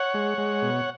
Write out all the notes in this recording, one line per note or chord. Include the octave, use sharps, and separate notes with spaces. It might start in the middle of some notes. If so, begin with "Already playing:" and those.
Already playing: C#5 F#5
G#3
G#3
B2